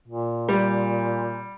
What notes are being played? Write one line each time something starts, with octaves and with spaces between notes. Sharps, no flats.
A#2
G3